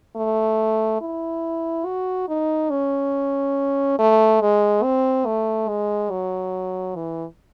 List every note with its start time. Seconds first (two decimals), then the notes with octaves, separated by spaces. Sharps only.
0.16 A3
1.01 E4
1.86 F#4
2.28 D#4
2.71 C#4
3.99 A3
4.41 G#3
4.83 C4
5.26 A3
5.68 G#3
6.11 F#3
6.95 E3